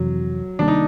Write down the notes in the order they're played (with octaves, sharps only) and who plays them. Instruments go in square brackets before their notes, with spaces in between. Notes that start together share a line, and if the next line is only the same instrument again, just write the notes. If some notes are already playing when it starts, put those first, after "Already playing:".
Already playing: [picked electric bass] F2 C3 E3 [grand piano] F#3
[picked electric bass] C3 D#3 G3 A#3 [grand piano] D4
[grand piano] D#4